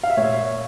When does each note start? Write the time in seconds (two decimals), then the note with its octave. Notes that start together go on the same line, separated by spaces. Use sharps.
0.03 F5
0.10 E5
0.17 A#2 C#5